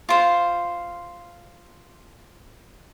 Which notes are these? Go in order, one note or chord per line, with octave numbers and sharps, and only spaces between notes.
F4 C5